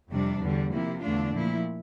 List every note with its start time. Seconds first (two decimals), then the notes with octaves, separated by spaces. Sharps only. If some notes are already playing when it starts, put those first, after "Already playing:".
0.11 F2 C3 G3 D4
0.40 E2 D3 G3
0.72 C3 F3 A#3 E4
1.02 E2 D3 A3 D4 F4
1.32 A#2 F3 A3 E4